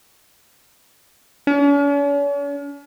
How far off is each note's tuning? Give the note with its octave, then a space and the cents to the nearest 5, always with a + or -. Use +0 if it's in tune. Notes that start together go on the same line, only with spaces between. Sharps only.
C#4 +45